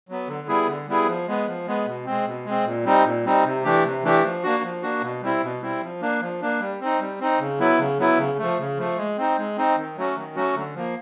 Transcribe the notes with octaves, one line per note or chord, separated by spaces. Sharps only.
F#3 B3
D3
G3 B3 E4 G#4
D3
G3 B3 E4 G#4
F3
G#3 B3
F3
G#3 B3
B2
G#3 C4
B2
G#3 C4
A#2
G3 C4 D#4
A#2
G3 C4 D#4
C3
E3 A3 D4 G4
C3
E3 A3 D4 G4
F3
A#3 D4 F#4
F3
A#3 D4 F#4
B2
G3 C4 E4
B2
G3 C4 E4
F3
A#3 D4
F3
A#3 D4
G3
C4 D#4
G3
C4 D#4
C#3
F#3 B3 E4
C#3
F#3 B3 E4
C#3
F3 A3
C#3
F3 A3
G#3
C4 D#4
G#3
C4 D#4
D#3
F#3 A3 C#4 F#4
D#3
F#3 A3 C#4 F#4
D3
F3 A#3